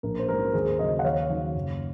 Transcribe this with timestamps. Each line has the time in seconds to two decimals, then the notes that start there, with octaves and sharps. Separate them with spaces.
0.03 A#1 A#4
0.19 C5
0.29 G#2 F#3 A#4
0.53 D#2 G#4 C5
0.79 C#3 F#3 C5 D#5
0.99 F#5
1.04 D#2 C#5 F5
1.30 D#3 F#3
1.55 F#1